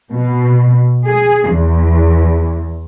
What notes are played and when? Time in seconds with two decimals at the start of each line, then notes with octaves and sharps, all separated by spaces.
0.12 B2
1.07 G#4
1.51 E2